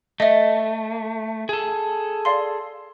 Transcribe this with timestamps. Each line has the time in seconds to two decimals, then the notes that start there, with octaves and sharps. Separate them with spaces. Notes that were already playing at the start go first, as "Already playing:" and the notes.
0.20 A3 D#5 E5
1.49 G#4 A4
2.25 D5 F5 C6